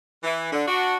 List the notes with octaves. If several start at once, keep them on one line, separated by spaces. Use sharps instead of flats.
E3
D3
D4 F#4